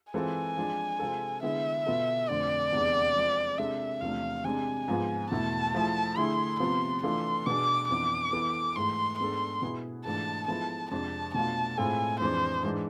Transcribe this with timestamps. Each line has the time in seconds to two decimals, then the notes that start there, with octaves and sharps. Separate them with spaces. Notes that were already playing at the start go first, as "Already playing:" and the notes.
0.13 E3 G#3 C4 F4 A4 G#5
0.57 F3 G#3 D4
1.00 C3 G#3 C4 F4 A4
1.43 D3 G#3 B3 E4 G#4 E5
1.86 B2 B3 F4 A4
2.29 F2 D3 A3 C4 D5
2.72 E2 C3 G#3 B3 D4
3.15 F3 G#3 C4 G#4
3.58 C3 G#3 D4 A4 E5
4.01 E2 C3 F3 A3 D4 F5
4.44 C3 G#3 D4 G#5
4.88 G#2 F3 G#3 B3 F4
5.31 E2 B2 A3 E4 A5
5.74 F3 A3 E4 G#4
6.17 D3 A3 E4 G#4 C6
6.60 C3 F3 B3 C6
7.03 E3 A3 D4 F4 A4 C6
7.46 B2 B3 D4 G#4 D6
7.90 F2 E3 B3 D4 D6
8.33 E3 B3 E4 A4
8.76 G#2 E3 A3 C6
9.19 G#2 G#3 B3 D4 A4 C6
9.62 B2 B3 E4 G#4
10.05 G#2 E3 A3 D4 F4 A5
10.48 F3 G#3 B3 E4 A4 A5
10.91 F2 C3 G#3 D4 A5
11.34 B2 A3 D4 F4 A5
11.78 A2 G#3 C4 F4 A4 G#5
12.20 F2 E3 G#3 D4 C5
12.63 G#2 E3 G#3 D4